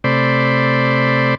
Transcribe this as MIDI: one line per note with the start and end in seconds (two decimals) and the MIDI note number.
0.04 1.35 48
0.04 1.35 57
0.04 1.35 72
0.04 1.35 74
0.04 1.35 83